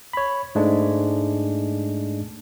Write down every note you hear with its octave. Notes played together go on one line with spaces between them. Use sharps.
C#5 B5
G#2 G#3 A3 D4